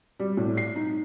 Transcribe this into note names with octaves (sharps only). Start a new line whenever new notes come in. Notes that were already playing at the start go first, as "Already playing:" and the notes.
G3
A2
C7
D#4